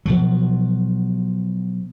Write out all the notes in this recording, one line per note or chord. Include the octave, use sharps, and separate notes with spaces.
B2 F3 F#3